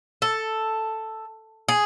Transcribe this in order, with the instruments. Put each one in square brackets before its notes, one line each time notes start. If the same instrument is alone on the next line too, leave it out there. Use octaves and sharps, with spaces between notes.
[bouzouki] A4
G#4